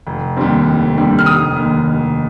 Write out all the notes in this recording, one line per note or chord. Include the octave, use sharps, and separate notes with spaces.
F1
D#2 D3 G3 C4
F1
D#2 D3 G3 C4
F6
F1 D#6
D#2 D3
F1